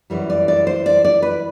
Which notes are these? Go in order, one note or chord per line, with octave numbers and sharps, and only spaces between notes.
F#2 E3 G3
D5
D5
C5
D5
D5
B4